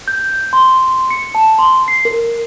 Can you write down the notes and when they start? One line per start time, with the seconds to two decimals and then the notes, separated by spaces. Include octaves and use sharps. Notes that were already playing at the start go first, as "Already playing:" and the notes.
0.08 G6
0.53 C6
1.10 C#7
1.35 A5
1.59 C6
1.88 C7
2.05 A#4